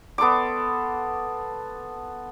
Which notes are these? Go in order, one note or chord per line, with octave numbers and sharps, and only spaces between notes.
B3 A4 C6 D6